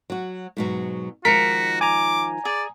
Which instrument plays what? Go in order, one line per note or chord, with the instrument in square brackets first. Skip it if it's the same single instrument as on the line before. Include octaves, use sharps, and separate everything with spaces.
[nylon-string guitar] F#3 F#4
G#2 B2 F#3
[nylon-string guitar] D#3 F3 G#3 [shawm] F#4 [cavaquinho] A#4 [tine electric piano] B6 C#7
[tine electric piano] G#5 A#5 [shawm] D6
[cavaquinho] G#4 [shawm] D5